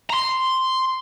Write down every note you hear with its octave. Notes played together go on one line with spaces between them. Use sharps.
A#5 C6